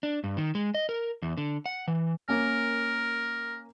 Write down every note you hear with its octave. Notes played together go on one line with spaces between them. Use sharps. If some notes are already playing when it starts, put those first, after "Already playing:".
D4
G2
D#3
G#3
D#5
A#4
E2
D3
F#5
E3
A#3 C#4 A#4